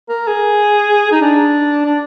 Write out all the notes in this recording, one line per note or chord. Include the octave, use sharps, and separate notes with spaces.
A#4
G#4
D#4
D4
D4